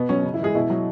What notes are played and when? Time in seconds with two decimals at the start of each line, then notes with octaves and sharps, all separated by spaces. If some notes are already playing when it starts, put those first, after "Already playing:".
Already playing: B2 B3
0.09 F#3 C#4
0.24 C#3
0.34 E4
0.39 E3 G#3 G#4
0.55 B2 E4
0.70 F#3